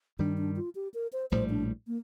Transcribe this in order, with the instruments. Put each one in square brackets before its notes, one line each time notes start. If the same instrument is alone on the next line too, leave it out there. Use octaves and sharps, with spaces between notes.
[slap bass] G2 D#3 G3 [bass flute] D4
[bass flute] D4
F4
G4
A#4
C5
[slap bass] A#1 A2 G3 [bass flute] C5
[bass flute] D4
A#3